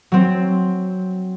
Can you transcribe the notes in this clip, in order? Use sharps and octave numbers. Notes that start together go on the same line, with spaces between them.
F#3 C4